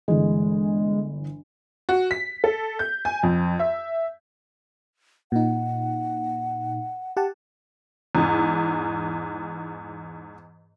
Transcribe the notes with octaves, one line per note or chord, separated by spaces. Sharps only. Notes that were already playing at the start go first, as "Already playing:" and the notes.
G1 E3 G#3
F#4
B6
A4
G6
G#5
F2
E5
A#2 D#4 F#5
G4 F#5 A5
E2 G#2